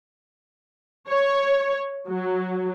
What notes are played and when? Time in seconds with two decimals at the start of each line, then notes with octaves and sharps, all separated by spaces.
1.09 C#5
2.09 F#3